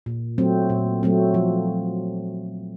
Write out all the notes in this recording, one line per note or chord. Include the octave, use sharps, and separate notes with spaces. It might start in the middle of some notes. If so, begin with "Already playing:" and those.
A#2
F#3 A3 C4
A#2
F#3 A3 C4
F3